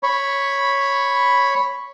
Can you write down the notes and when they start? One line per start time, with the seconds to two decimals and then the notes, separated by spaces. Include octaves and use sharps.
0.03 C#5 B5